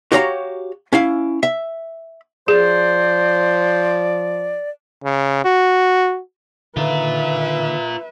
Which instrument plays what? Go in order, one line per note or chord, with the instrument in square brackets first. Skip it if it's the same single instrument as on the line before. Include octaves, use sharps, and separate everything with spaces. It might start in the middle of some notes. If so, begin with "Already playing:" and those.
[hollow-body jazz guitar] F#4 G4 C#5 F5 G5 A#5
C#4 E4 F5
E5
[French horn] F3 [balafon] G#4 [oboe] C5 [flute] D5
[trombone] C#3
F#4
[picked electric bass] D3 D#3 [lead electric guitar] F4 A#4 [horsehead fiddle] B4 E5